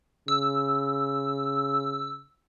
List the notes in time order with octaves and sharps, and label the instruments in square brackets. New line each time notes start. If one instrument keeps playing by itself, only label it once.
[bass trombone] C#3 [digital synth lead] E6